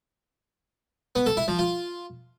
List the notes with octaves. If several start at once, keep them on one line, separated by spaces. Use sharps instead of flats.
B3
A4
E4
F3
F4